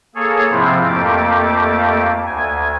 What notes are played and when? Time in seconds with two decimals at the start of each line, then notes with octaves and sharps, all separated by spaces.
0.15 A#3 G#4 A4 C#5
0.51 G#2 C3 F3 C4 E4
0.88 F2 A3 A#3 G4 D6
2.26 D2 G#5